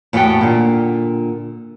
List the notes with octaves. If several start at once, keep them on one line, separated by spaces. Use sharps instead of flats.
E2 A2 F#4 G4 G5 A5
A#2 D3